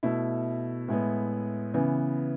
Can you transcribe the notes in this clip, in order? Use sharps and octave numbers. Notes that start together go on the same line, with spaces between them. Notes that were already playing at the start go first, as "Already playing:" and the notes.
B2 A3 E4
A2 G#3 B3
C#3 E3 B3